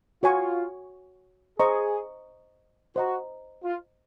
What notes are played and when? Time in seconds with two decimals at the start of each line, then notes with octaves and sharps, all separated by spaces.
0.23 F4 F#4 C#5 G#5 C#6
1.59 G#4 C5 D#5 A#5 C#6
2.96 F#4 C5 D#5 A#5
3.64 F4